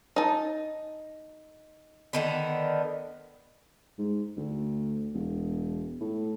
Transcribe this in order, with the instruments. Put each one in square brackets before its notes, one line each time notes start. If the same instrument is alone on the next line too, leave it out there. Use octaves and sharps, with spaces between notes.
[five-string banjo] D#4 A5
[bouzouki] D3 D#3 B3
[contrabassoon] G#2
D2
E1
A2